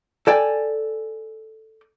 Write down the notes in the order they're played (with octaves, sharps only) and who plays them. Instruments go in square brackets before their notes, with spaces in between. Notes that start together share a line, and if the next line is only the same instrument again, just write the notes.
[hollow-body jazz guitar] A4 D5 G5 G#5